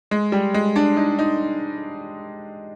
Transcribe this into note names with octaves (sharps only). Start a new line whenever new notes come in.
G#3
G3
G#3
D4
D#4
D#4